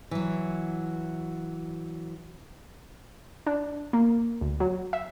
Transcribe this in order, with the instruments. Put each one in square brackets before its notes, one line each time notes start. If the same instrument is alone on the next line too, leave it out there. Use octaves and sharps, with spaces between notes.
[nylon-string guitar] E3 F#3
[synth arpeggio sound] D4
A#3
D2
F#3
E5